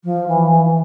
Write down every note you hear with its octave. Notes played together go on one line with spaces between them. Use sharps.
F3
E3
E3
E3